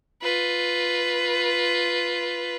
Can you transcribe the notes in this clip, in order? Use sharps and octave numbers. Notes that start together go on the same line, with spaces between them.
F4 B4